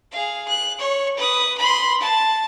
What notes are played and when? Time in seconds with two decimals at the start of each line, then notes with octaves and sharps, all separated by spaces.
0.12 G#4 F5
0.48 F#6
0.79 C#5 C#6
1.17 B4 D#6
1.58 B5 C6
2.01 A5